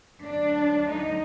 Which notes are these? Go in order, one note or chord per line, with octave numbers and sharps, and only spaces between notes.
D2 D3 F#3 D4
D#4